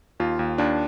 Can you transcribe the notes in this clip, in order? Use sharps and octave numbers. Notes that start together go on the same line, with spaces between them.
D#2 F4
D#2
D#2 D4